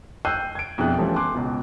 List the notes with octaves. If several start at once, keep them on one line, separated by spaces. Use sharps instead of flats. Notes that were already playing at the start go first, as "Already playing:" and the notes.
G5 E6 F#6 G6 C7 D#7
G#6 D7
F2 B2 D4 E4 G#4 F#6
E3 F3 G3 A3 B3 C#4
G#5 C6 D6 F#6
C#2 B2